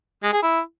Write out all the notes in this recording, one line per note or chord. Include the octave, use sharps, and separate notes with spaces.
G#3
G#4
E4